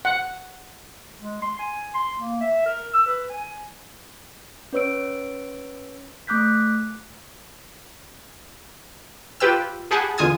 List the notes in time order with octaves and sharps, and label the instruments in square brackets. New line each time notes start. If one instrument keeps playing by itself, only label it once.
[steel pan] F#5
[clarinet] G#3
C6
G#5
C6
A#3
E5
A#4
E6
B4
G#5
[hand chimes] C#4 B4 C#5 E6 D7
A3 D6 F#6 G6 B6
[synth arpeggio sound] F4 G4 B4 G5 E6
G4 G#4 F#5 G#5 A5 B5
E2 D3 F4 G#5 D#6 G#6